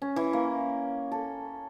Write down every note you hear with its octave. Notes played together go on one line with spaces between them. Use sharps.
C#4
E3
A#3
A4